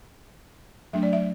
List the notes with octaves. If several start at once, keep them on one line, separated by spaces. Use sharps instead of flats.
F#3 A3 D4 E5
D5
E5